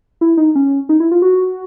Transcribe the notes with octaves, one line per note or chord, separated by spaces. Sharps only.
E4
D#4
C#4
D#4
E4
F4
F#4